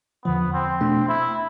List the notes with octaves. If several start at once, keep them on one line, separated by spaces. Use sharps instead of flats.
E2 D3 F3 B3
C4
B2 A3 D4
E4